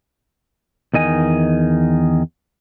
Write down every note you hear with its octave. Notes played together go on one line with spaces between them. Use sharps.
E2 D#3 D#5 G#5